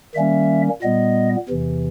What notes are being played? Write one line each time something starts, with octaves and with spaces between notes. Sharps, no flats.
D#3 G3 A#3 C#4 E5
A#2 G3 B3 D#5
E2 C3 E3